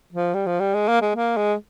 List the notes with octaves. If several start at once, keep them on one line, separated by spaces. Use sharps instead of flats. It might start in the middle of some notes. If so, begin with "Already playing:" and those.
F3
G3
F3
G3
G#3
A#3
G#3
A#3
G#3